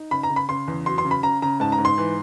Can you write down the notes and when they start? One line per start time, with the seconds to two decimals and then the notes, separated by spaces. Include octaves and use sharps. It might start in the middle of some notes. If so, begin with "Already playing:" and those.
Already playing: D#4
0.11 C#3 B5
0.23 A#5
0.30 C#3
0.36 B5
0.49 C#3 C6
0.68 E2
0.86 F#3 C6
0.98 C6
1.05 C#3
1.11 B5
1.23 C#3 A#5
1.42 C#3 A#5
1.60 G#2 A5
1.72 A#5
1.78 G#2
1.85 C6
1.98 E3